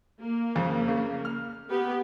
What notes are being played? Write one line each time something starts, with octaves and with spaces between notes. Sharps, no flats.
A#3
F2 C#3
C#3
F6
B3 G4 B4